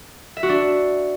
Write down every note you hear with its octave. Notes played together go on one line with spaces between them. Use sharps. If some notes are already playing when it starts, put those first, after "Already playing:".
E5
F#4
D4